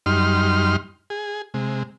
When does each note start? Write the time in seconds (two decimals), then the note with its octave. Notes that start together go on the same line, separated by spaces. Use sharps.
0.06 F#2 G3 D#4 C6 F6
1.10 G#4
1.54 C3 G#3